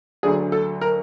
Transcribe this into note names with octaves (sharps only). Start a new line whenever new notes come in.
D2 D3 F#3 A3 D4 G#4
A4
A#4